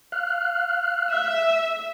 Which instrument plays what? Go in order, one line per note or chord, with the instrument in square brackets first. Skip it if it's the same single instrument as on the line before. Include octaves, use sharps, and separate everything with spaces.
[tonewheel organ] F5 F6 F#6
[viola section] E5